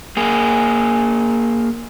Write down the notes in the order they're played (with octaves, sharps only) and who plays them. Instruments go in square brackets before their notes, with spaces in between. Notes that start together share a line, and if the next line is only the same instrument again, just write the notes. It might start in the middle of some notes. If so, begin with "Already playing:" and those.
[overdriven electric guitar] A#3 G#4